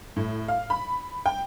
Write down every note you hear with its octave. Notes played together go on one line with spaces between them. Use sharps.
A2
F5
B5
G5